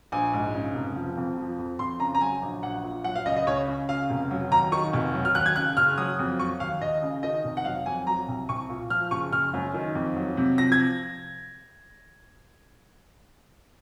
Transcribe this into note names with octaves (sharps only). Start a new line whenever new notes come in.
A#1 G#5
G#2
C#3
F1
F3
F2
F3
F2
F2 C6
C#3 A#5
A#5
F#3 G#5
A#1
A#1 F#5
A#2
F#3 F#5
F5
C#2 D#5
D#5
C#2 C#5
C#3
C#3 F5
F1
F#3
D#2 A#5
D#3 C#6
F1
F#3
F6
D#2 F#6
G#6
C#3 F#6
F#1 F6
F#3 D#6
F2
F#3 C#6
D#2 F5
D#2 D#5
C#3
D#3 D#5
F1
F#5
F#3 F5
F2 G#5
F#3 A#5
C2
C2 C#6
A#2
F3 F6
F#1 C#6
F#1 F6
F#2
D#3
F2
F#3
C3
F3 A#6
G#6